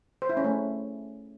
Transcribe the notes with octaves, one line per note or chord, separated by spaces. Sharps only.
C5
E4
C#4
A3